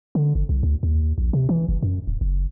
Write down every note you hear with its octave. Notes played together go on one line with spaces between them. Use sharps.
D3
G1
C2
D2
D#2
A#1
C3
E3
F#1
F#2
D1
F#1